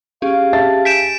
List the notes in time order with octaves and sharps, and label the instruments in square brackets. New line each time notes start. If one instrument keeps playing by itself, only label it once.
[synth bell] C#4 G4 G#4 [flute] F5
[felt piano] E5 A5 A6
[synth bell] G#5 G6 [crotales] B6 D7 E7